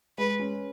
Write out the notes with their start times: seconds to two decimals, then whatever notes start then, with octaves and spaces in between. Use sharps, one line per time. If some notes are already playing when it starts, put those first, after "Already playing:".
0.18 G#3 B4
0.39 C#4